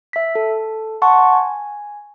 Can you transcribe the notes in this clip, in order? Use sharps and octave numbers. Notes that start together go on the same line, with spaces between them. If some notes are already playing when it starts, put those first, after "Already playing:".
E5 B6
A4
F#5 A5 C6 C#6
G#5